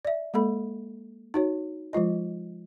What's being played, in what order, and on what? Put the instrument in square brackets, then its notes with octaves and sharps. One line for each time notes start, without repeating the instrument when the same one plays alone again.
[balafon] D5 E5
G#3 A#3 A4 B5
D#4 F#4 C#5
F3 G#3 F4 D#5